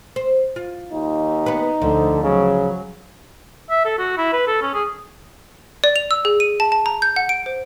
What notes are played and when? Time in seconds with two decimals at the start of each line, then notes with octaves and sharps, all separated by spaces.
0.16 C5
0.56 F4
0.93 D#2 D#4
1.46 B3 B4
1.82 D2 D3 F3 A3
2.23 C#3 F#3
3.70 E5
3.85 A4
3.99 F#4
4.17 E4
4.33 B4
4.47 A4
4.61 C#4
4.74 G#4
5.84 D5
5.96 F7
6.11 E6
6.25 G#4
6.40 D#7
6.60 A5
6.72 A5
6.86 A#5
7.02 G6
7.16 F#5
7.29 D7
7.46 C5